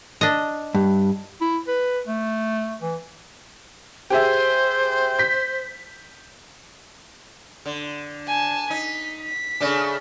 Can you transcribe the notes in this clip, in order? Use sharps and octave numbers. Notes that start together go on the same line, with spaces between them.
D4 D#5
G2
E4
B4
A3
E3
G4 G#4 C5 E5
G6 B6
D3
G#5 A5
D#4 B6
B6
C#3 A3 D4